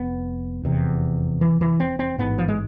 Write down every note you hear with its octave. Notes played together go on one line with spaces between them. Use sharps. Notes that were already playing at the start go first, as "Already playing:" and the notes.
Already playing: F1 F2 B3
F1 E2 C3
E3
E3
C4
C4
A1 G#2 B3
F3
G#3